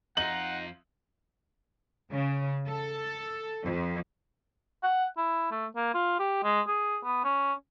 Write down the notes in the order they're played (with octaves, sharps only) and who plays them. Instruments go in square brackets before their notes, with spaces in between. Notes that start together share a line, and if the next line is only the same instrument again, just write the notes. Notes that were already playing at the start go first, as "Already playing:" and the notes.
[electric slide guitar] F2 F4 [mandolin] D#4 [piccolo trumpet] F#5 [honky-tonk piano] F#7
[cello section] C#3
A4
F2
[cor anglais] F#5
E4
A3
A#3
F4
G4
G#3
G#4
B3
C#4